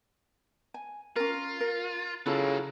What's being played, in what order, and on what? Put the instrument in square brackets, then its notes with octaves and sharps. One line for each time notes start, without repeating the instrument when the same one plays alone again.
[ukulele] G#5
[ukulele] C#4 A#4 [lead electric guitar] F4
[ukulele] A#4
[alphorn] C#3 [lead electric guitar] F#3 A#3 [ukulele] E4 F4 A4